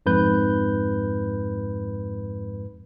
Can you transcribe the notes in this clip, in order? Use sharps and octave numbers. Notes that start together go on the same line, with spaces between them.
F2 G#2 B4 G6